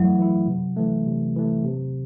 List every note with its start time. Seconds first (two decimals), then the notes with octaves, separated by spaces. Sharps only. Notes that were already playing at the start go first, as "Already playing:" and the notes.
Already playing: F#2 E3 F#3 A3 E4
0.18 E3 A3 E4
0.48 C3
0.76 E3 A3
1.06 C3
1.36 E3 A3
1.65 C3